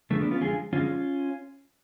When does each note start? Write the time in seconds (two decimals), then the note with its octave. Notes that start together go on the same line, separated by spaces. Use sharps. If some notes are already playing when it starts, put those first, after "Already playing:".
0.10 F2 D3 F3 G#3 A3
0.21 B3 D4
0.31 C#4 F4
0.41 F2 D3 F3 G#3 F4 G#4
0.73 F#2 D3 F3 G#3 C#4 F4